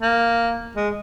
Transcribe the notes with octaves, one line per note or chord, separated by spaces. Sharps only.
A#3
G#3